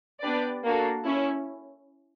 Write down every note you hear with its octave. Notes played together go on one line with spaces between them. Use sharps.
B3 D4 G4 B4 D5
A#3 D4 F#4 A4
C#4 E4